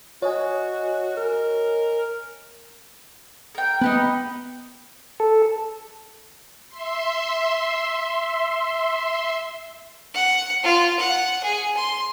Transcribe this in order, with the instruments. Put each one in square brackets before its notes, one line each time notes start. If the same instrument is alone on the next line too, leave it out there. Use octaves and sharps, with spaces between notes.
[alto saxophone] F#4 [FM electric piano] C#5 D#5 G#5
[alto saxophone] A#4
[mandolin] A#4 G5
[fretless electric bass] B3 [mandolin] D#4 G4 B4
[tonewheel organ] A4
[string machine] E5 C6
[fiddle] F#5
F4
F#5
G#4
C6